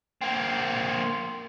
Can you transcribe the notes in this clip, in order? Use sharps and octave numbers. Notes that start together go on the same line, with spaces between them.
A#3 C4